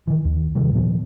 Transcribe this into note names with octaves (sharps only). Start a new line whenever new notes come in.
D#3 E3
D#2
C3 D#3 E3 G3
A#2 F3 B3